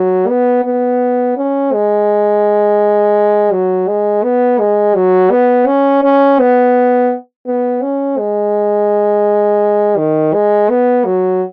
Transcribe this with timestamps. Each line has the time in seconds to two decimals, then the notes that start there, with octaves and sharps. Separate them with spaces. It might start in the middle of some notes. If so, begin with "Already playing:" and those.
Already playing: F#3
0.28 B3
0.65 B3
1.37 C#4
1.73 G#3
3.52 F#3
3.88 G#3
4.23 B3
4.59 G#3
4.95 F#3
5.31 B3
5.67 C#4
6.03 C#4
6.39 B3
7.46 B3
7.82 C#4
8.18 G#3
9.97 D#3
10.34 G#3
10.70 B3
11.05 F#3